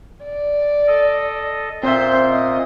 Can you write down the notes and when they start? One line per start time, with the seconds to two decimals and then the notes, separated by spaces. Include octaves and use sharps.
0.25 D5
0.88 A4 D#5
1.83 A#2 C4 C5 E5
2.30 D#5